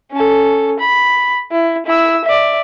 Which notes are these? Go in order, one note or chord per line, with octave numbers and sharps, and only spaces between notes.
C#4 A4
B5
E4
E4 E6
D5 E5